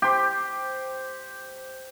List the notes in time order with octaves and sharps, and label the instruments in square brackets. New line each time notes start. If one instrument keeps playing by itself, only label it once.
[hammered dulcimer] G4 C5